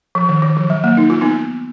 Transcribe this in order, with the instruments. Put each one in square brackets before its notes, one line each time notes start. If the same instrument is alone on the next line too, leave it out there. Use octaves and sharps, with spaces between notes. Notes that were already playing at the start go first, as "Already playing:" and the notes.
[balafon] F3
D#3
D#3
F3
F#3
A#3
D#4
F4
B3 D#4